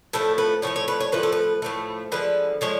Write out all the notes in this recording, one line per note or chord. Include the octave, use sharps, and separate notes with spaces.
A2 F3 A3 A4
B4
A2 F3 A3 C#5
C#5
B4
C#5
A2 F3 A3 B4
A4
B4
A2 F3 A3
D3 F3 G#3 B4
D3 F3 G#3 C#5